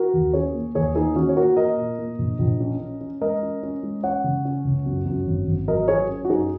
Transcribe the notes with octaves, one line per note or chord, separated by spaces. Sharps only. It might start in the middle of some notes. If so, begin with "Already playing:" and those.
Already playing: F#4 A#4
D#2
C#4 G#4 C#5
A#3
D#2 G#4 C#5
A#3 D#4 G#4
D#3 C#4 F#4
C#5
A#3 F#4 A#4
A#3 A#4 D#5
A#2
A#3
A#1
A#1
C#4
C#4
C#4
G#3 A#4 D#5
C#4
C#4
G#3
C#4 C#5 F#5
C#3
C#4
C#2
F#2
F#2
G#1
G#1
F#3 A#4 D#5
F#3 G#4 C#5
C#4
F#4
F#2 D#4 G#4